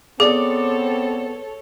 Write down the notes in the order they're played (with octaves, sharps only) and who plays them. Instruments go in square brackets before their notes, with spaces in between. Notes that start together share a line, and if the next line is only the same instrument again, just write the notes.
[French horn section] B3 C4 [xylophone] G#4 [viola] A4 C#5 [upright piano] D5 D6